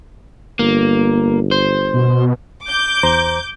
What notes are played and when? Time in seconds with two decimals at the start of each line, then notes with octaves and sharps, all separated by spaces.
0.59 G1 A#3
1.51 C5
1.94 B2
2.64 D6 G6
3.03 E2 C5 A#5